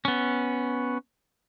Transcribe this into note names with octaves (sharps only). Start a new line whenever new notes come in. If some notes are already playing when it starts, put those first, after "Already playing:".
B3 C#4